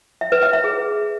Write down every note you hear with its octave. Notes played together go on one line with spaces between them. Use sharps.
E5
B4
E5
E5
G#4